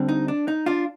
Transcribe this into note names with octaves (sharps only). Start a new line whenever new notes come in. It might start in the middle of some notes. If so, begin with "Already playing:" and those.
Already playing: D2 D3 G3 C4
D#4
D4
D#4
D4 F4